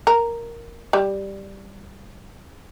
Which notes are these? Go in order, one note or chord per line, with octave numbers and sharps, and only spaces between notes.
A#4
G3